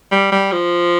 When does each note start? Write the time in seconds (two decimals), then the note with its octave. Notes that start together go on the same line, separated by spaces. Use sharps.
0.12 G3
0.32 G3
0.52 F3